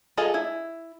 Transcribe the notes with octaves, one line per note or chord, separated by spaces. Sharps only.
F4 G#4 A4 D#5
E4